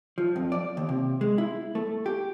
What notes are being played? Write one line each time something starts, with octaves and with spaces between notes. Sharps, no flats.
F3
F2
D5
D#2
C3
G#3
E4
A3
G4